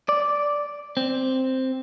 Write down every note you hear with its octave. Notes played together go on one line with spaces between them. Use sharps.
D5
C4